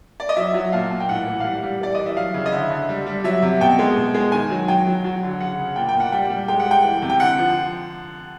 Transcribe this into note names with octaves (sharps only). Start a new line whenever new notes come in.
D5
D#5
F#3 E5
F#3
A#2 F5
A#2
G5
A2 F#5
E3
F5
G3 F#5
G3
E3 D5
E3 D#5
E5
F#3 F5
C#3
D#5
D3 E5
D3
G3
G3
F#3 E5
C3
B2 G5
G#3
B2
G#3
D#3 G#5
F#3
F#3 G5
F#3
F#3
D3
C#3 F#5
C#3
A#2 G5
G5
A#2
F#5
G3 G5
G3
G#3 G5
F#5
G#3
G5
E3
C3
G5
D3 F#5
F3